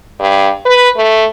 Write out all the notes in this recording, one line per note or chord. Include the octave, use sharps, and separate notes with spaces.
G2
B4
A3